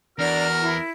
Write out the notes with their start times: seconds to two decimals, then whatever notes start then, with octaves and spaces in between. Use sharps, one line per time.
0.19 E2 D4 F#4 A#4 F6
0.62 E4